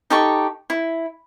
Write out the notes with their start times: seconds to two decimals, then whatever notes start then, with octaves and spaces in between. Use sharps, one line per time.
0.10 D#4 G4 A4 C#6
0.70 E4